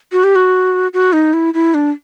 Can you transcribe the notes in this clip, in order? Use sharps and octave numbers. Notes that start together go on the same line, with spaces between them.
F#4
G4
F#4
F#4
D#4
E4
E4
D4